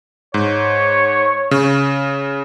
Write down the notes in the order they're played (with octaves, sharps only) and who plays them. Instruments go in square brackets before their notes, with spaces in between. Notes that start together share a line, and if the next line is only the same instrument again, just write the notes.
[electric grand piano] G#2 [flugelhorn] C#5
[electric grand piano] C#3